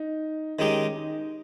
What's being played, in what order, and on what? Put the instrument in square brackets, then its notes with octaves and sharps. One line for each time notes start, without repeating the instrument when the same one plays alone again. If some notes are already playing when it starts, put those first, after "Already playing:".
Already playing: [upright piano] D#4
[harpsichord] D#3 G#3 D#4 G4 [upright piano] C#4
[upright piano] D#4